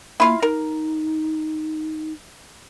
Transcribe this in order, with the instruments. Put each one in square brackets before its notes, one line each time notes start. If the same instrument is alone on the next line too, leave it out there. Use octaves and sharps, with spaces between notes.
[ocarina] A#3 [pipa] E4 F4 F5
[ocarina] D#4 [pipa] A#4